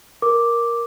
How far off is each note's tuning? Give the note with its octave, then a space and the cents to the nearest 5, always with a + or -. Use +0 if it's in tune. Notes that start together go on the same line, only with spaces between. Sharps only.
A#4 +10 D6 +0